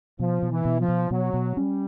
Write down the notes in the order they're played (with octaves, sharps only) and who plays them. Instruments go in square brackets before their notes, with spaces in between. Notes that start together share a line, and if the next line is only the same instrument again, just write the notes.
[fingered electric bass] B2 [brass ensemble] F3
[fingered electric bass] B2
[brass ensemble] E3
[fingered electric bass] B2
[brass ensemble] F3
[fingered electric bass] B2
[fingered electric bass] B2 [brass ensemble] F#3
[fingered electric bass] B2
[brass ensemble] G3 [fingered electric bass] C#4